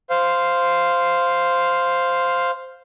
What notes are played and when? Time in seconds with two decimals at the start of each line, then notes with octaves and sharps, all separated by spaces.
0.10 C5 F5